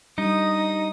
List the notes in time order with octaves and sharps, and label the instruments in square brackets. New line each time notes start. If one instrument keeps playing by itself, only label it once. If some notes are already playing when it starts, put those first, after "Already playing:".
[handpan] G3 D4 [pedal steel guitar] D#4 [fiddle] D#6